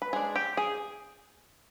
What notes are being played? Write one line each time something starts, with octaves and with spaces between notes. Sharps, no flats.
B4
G#3 D4 G#4
G4
G#4